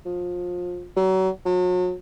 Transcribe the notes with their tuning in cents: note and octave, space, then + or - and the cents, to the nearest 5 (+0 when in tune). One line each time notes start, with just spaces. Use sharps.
F3 +25
F#3 +30
F#3 -35